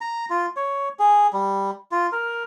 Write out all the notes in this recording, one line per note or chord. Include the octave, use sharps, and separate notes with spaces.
A#5
F4
C#5
G#4
G3
F4
A#4